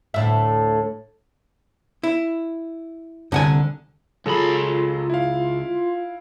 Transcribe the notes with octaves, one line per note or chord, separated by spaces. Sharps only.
D2 A2 E5
E4
C2 D3 F#5 G#5
C#2 F#3 F4 G#4 A4 B5
E4 F5